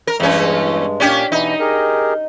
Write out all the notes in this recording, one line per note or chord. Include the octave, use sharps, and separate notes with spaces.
A#4
E2 G2 G#3 C#4
A#2 C#4 D4 G4
B2 E3 D#4 E4
G4 G#4 A#4